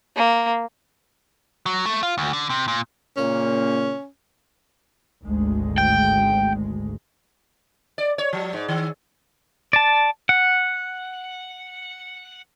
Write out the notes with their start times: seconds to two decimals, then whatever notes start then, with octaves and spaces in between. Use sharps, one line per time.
0.16 A#3
1.66 F#3
1.86 A3
2.03 F4
2.18 D2
2.33 D3
2.50 C3
2.68 A#2
3.17 A#2 C#3 A#3 C#4
5.23 G#1 D2 G#3
5.78 G5
7.98 D5
8.18 C#5
8.33 F3
8.53 G#2
8.68 D#3
9.73 D5 A5
10.29 F#5